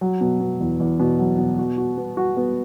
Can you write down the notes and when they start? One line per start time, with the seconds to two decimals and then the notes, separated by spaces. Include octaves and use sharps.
0.01 F#3
0.21 B2
0.40 B2
0.60 E2
0.80 E2
1.00 B2
1.19 F#3
1.39 B2
1.59 F#4
1.78 F#4
1.97 B3
2.17 F#4
2.37 B3